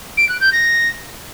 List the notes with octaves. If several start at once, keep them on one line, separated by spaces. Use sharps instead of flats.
D7
F#6
G6
A#6